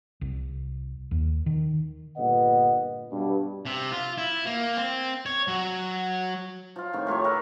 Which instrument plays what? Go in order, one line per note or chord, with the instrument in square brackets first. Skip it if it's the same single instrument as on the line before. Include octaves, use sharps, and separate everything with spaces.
[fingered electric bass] C2
D#2
D#3
[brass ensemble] G1 A#2 B3 B4 D#5 F#5
G2 B2
[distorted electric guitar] C3
F4
E4
A#3
C4
C#5
F#3
[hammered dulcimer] F3 F4
A2 D#3 C4 C#6
A3 F4 G4 C#5
G4 A#4 B4 E5